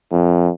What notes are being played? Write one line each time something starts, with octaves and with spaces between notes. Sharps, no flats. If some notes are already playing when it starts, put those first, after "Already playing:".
F2